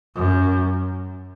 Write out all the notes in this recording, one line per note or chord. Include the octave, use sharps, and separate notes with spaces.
F#2